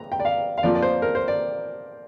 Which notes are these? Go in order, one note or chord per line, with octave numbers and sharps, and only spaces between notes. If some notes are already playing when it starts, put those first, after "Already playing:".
Already playing: A#5
G5
D5
F5
F5
F2 F3 A#3 F4 D5
D5
C5
A#4
C5
D5